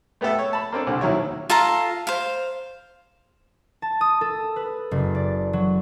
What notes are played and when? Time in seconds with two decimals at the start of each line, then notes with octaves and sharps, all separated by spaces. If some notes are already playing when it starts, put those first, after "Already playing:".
0.21 A3 B3 G4 A4 E5
0.39 C#5
0.53 A5 B5
0.72 A#3 C4 D4 A4
0.87 C2 D3
1.01 D#2 D#3 F#3 E4 C#5
1.50 F4 A4 F5 A#5
2.07 C5 F5
3.82 A5
4.01 D#6
4.21 A4
4.56 B4
4.91 F#1
5.15 D5
5.53 F#3